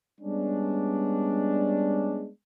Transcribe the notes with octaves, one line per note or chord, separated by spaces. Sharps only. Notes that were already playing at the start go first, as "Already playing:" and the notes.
G3 G#3 B3 C#4 D4